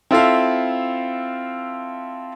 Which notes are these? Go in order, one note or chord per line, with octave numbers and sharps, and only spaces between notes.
C4 E4 F4 A4 E5 F5